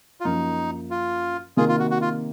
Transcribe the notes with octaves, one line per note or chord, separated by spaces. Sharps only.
F4
F#2 F3 A#3 D#4
F4
C3 D#3 A#3 F4 G#4
F4
F#4
F#4
F4